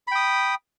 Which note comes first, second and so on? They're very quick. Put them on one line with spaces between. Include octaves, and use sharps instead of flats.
B5 G5 D#6